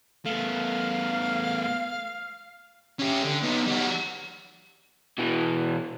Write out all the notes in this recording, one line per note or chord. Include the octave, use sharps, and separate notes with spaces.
A3 B3 F5
C#4 G4
D3
B3 D#4
G3 F#4
B2 E3